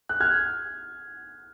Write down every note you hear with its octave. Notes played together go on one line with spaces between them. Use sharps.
F#6
F6 G#6